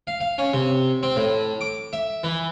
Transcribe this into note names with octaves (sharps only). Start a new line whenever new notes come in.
F5
F5
C#4
C3
C4
A2
D6
E5
E3